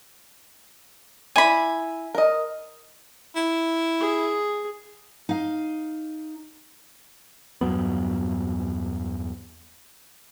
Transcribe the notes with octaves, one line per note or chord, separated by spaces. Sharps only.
E4 D5 G#5 B5
A#4 D#5
E4
G#4
D#4 F5
E2 G2 F#3 B3